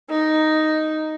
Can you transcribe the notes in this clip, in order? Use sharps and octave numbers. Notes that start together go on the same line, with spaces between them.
D#4